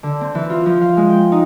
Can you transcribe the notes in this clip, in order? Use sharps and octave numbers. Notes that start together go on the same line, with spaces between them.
D3
C4
E3
F4
F3
F5
G#3
G5
D#4